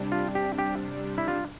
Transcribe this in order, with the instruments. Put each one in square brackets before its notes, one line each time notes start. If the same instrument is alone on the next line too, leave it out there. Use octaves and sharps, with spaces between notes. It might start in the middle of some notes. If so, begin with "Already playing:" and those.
Already playing: [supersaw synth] C3 G3 D4
[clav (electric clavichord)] F4
G4
G4
E4
F4